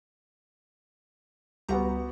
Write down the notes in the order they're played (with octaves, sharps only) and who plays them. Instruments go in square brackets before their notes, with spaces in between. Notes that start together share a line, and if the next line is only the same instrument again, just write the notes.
[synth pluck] C#2 G3 A#5 [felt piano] B3 F#4 G4